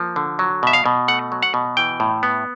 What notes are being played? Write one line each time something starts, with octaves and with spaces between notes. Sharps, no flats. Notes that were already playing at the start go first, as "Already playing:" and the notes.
Already playing: F3 A#3
D3
F#3
B2 E5
F5
B2
A3 F#5
F#3
F#5
B2
E3 G5
A2
B3